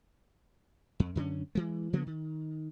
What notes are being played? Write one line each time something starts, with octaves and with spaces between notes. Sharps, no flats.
F2
F#2 D3 C4 C#4
E3 G#3
C#3 F3 A#3 B3
D#3